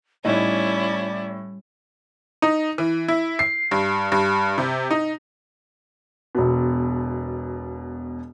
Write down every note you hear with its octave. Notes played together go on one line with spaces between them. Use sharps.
A2 G3 C#4 D#4 E4 D5 D#5
D#4
E3
E4
C7
G2
G2
C3
D#4
E1 B2